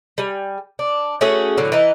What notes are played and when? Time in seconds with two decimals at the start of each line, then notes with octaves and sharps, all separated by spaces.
0.18 G3 G#5
0.79 D4
1.21 A3 C#4 F#4 G#4
1.57 A2 D3 F#3
1.72 E3 D#4